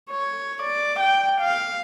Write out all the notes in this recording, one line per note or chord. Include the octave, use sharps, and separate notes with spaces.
C#5
D5
G5
F5